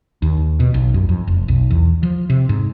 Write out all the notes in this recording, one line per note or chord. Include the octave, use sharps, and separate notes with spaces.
D#2
B2
B1
F#2
F2
F1
B1
E2
F3
C3
G#2